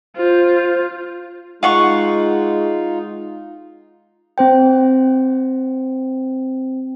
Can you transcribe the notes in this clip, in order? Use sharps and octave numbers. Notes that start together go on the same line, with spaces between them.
F4 C5
G#3 D#4 F4 F5 F#5 C#6
C4 C5 G5